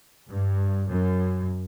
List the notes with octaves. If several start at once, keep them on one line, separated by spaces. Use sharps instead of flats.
G2
F#2